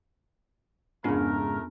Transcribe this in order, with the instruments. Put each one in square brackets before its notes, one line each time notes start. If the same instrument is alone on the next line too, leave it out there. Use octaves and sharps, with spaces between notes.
[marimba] F2 C#4 [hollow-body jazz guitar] G#2 C#3 [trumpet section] A3 A#4 [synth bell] B3 D4